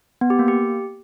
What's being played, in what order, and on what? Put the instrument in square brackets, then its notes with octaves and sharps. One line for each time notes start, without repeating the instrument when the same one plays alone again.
[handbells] B3
G4
A#3
G4